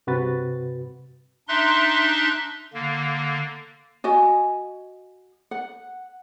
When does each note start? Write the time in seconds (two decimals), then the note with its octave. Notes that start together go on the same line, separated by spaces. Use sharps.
0.07 G2 C3 F#4 B4 A6
1.48 D4 D#4 E5 C6 F#6
2.74 D3 A#3
4.04 F#4 D#5 G#5
5.51 F#5